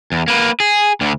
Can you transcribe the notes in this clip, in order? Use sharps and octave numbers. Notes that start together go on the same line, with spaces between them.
E2
A#3 B4
G#4
D2 D3